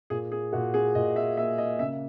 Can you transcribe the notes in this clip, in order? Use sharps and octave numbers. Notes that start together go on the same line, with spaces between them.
A#2 G#4
G#4
A#2 F#4
G#4
A#2 D#5
E5
A#3 E5
D#5
C#3 E5